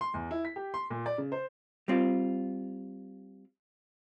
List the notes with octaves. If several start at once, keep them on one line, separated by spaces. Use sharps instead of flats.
C6
E2
E4
B6
G4
C6
A#2
D5
C#3
C5
G3 C4 F4